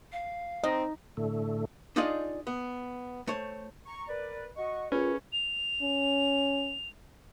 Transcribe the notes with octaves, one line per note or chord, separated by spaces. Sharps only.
F5
C4 D#4 D#5
A2 D3 A3
D4 D#4 F4 G#4 D5 D#5
B3
A3 C5 C#5
A#5 C#6
A#4 B4 D5
F#4 D#5 C#6
D#2 C#4 F4 G#4 B4 C#5
F7
C#4